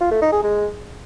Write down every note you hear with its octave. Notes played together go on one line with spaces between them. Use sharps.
F4
A3
D#4
G#4
G#3